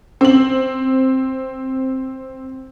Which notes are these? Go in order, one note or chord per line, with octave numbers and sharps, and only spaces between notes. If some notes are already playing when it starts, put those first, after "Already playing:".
C4 F#7